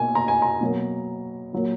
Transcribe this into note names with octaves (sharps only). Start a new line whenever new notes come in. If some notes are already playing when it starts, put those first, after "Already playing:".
Already playing: B2 A#3 G#5
A#5
G#5
A#5
B2 F#3 A#3
A#2 F#3 A#3